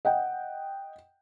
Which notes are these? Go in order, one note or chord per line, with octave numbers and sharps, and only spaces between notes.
D#5 F#5 G5